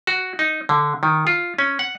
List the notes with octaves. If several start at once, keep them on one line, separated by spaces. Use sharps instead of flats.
F#4
D#4
D3
D#3
F4
C#4
F#5